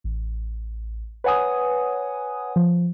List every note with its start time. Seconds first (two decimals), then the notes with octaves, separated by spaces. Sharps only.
0.04 A1
1.24 B4 C#5 F#5 G#5 D#6
2.56 F3